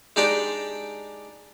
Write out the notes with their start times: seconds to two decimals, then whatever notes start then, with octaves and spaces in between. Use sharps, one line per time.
0.16 G#3 D4 D#4 G4 D5